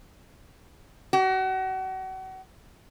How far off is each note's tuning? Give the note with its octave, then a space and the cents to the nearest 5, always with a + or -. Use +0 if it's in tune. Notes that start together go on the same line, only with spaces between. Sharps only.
F#4 +35